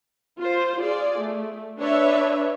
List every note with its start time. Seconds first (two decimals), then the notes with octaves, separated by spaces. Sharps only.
0.39 F4 C5
0.80 F4 G#4 D5
1.17 A3
1.80 D4 B4 C#5 E5